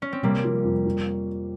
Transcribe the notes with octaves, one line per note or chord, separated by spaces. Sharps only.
C#4
C4
C3 G3 A#3
F3
F2
F3